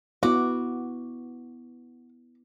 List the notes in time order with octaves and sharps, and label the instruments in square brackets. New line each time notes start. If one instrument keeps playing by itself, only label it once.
[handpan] B3 E4 [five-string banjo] F#4 [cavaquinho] D6